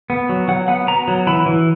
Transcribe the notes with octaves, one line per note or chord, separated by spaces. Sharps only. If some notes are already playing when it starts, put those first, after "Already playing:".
B3
F#3
F#3 F#5
B3 F#5
B3 A#5
F#3
E3 B5
E3